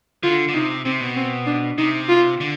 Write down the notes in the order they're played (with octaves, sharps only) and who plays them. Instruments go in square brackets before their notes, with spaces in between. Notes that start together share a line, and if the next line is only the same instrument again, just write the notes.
[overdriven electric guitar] D3 [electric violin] F4
[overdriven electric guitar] D3
[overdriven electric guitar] C3 [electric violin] D#4
[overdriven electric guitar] C3 [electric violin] C4
[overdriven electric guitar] B2
[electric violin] C4
D4
[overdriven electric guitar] C3 [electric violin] D#4
[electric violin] F4
[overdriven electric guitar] D3